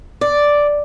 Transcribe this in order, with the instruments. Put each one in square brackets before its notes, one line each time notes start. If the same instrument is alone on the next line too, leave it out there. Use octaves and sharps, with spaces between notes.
[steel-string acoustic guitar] D5